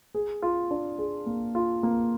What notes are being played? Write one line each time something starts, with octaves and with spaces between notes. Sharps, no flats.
G#4
F4
D4
G#4
A#3
F4
A#3